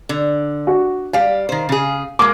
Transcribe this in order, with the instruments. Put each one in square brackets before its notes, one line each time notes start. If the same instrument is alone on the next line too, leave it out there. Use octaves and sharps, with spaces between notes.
[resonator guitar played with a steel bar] D3
[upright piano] F#4
[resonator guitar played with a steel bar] G3 G4 [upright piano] F5
[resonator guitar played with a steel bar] D#3 C5
C#3 G#4
[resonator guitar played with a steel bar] G#3 A#3 [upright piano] D6